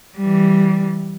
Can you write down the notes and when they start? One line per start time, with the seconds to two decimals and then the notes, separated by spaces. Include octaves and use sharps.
0.18 E3 G3